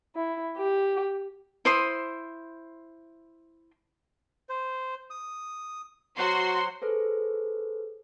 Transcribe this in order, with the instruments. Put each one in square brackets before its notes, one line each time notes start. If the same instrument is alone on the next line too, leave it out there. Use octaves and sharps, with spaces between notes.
[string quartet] E4
G4
[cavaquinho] E4 C5 C6 D#6
[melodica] C5
D#6
[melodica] F#3 C5 F#5 [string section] F#4 C6
[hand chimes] G#4 A4 B4 C5